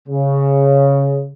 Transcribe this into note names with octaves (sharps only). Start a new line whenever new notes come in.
C#3